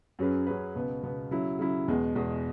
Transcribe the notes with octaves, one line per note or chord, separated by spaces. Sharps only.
F#2 F#3 C#4 G#4 B4
F#2 F#3 C#4 G#4 B4
C#2 B2 B3
C#2 B2 B3
C#3 F#3 E4
C#3 F#3 E4
E2 B2 G#3
E2 B2 G#3